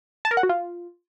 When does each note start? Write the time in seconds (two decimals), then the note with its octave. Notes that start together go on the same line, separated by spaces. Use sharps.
0.25 A5
0.31 A#4
0.37 F#5
0.43 F#4
0.49 F4